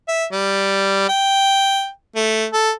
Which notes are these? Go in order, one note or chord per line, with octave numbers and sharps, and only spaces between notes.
E5
G3
G5
A3
A4